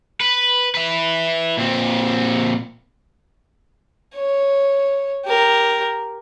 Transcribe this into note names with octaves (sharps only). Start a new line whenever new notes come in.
B4
E4 B4
A#2 C4
C#5
G4 A#4